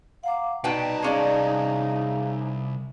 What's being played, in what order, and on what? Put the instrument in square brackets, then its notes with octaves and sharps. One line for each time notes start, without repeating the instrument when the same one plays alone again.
[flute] F5 [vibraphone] F#5 A#5 D6
[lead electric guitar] C2 A5 [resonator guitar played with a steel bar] B2 B4 G5 [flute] D#4 [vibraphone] D5
[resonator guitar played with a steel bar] G#3 C#4 D5 [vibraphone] G#4 F5 G#5